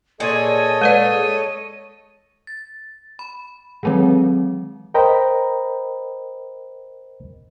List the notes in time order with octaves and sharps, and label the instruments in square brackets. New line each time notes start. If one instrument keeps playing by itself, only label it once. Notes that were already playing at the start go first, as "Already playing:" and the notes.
[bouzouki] A#2 G#4 [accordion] A4 C#5 D#5 [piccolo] G#5
[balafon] G#3 B4 D5 [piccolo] D#7
[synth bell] A6
B5
D#3 E3 F#3 G#3 C4
[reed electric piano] A#4 C5 D#5 G5 A#5 B5